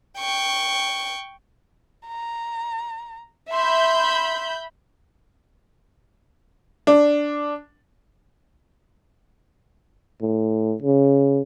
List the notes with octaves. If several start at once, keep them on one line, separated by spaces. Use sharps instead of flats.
G5 C#6
A#5
E5 B5 C6 G6
D4
A2
C#3